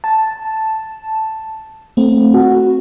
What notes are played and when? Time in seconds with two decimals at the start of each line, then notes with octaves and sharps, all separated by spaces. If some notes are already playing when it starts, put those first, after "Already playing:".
0.04 A5
1.97 A3 C4
2.34 F#4